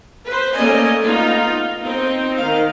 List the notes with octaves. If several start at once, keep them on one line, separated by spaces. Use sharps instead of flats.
B4 C5
A3 A#3 C#4 D5 D#5 G#5
B3 D#4 F4
C4 D#4
D#3 F5